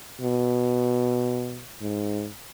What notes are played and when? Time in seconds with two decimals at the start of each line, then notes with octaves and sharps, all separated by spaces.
0.21 B2
1.81 G#2